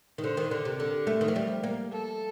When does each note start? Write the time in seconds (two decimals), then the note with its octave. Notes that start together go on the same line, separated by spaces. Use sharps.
0.18 D#3
0.23 D3 C5
0.37 D#3
0.51 D3 A#4
0.65 C3
0.80 D3
1.07 A3
1.21 D#3
1.28 F3
1.36 G3
1.63 A#3
1.92 A4